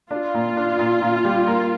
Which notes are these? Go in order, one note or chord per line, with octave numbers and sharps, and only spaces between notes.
D4 F4
A#2
D4
A#2
A#2
G3
A#3